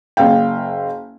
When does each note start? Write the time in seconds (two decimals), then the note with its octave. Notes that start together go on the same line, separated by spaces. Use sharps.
0.17 F#1 F5 G5